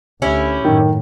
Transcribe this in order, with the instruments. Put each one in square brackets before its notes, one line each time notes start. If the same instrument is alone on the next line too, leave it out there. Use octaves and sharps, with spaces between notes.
[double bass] D2 [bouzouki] C#4 E4 G4
[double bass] F#2 A2 [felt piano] D#3